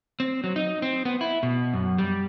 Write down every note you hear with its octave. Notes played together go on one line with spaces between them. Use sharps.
C4
F#3
D#4
C4
B3
E4
B2
F#2
G3